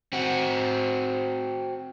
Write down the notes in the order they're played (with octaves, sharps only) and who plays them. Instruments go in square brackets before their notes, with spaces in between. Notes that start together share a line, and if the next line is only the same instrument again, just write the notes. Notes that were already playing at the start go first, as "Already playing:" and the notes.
[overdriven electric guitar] C4 F#4